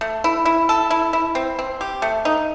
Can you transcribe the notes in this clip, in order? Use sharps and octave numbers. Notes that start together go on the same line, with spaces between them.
A3
E4
E4
A4
E4
E4
C4
C4
G4
A3
D#4